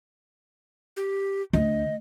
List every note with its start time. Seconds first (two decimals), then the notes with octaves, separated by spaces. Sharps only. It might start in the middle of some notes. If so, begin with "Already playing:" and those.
0.97 G4
1.53 D2 D#5